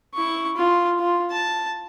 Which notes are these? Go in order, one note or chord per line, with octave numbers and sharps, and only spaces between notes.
E4 C#6
F4
F4
A5